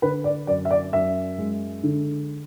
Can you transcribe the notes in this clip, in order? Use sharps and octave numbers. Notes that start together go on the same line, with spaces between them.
D3 B4
D5
F#2 D5
E5
D5
F#2 E5
G#3
D3